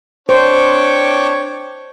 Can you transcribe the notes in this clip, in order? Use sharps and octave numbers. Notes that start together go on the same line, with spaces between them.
D4 C5 C#5 G5 C#6 D6